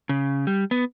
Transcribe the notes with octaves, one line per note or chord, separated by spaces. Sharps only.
C#3
G3
B3